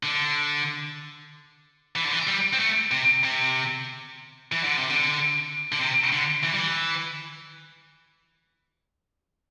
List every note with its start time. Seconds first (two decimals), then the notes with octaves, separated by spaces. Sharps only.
0.03 D3
1.96 E3
2.04 D3
2.13 E3
2.27 G3
2.53 C4
2.60 A3
2.91 C3
3.23 C3
4.52 E3
4.64 D3
4.77 C3
4.90 D3
5.72 D3
5.79 C3
6.12 D3
6.43 E3
6.52 G3
6.60 E3